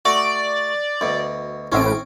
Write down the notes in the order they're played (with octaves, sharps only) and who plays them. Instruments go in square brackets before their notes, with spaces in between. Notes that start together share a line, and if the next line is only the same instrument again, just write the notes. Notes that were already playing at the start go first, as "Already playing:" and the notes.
[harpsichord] A3 F#4 [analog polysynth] D5
[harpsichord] D2 B2
[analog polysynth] A1 A2 D7 [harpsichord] C4 C#4